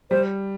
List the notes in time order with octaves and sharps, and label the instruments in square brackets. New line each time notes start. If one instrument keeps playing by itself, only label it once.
[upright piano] G3 [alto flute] C5